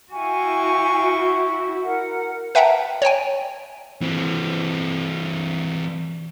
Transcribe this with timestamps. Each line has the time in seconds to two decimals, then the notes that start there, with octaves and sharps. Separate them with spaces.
0.12 E4 F#4 F5 G5 G#5 C#6
1.81 A#4 F#5
2.55 B4 E5 F#5 G5 A5 A#5
3.02 C#5 D5 G5 G#5
4.02 E3 C4